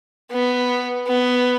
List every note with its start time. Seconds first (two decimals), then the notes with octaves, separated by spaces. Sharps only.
0.31 B3
1.08 B3